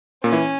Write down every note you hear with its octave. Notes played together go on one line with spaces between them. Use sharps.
A#2 A#3 C#4
E3 E4